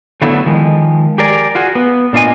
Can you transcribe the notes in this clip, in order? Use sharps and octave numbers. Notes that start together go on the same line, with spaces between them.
D3 F#3 A3 B3 E4
D#3 F3 G#3
G4 G#4 A#4 D5
F4 F#4 G#4
B3
A#2 D4 F4 D#5 G#5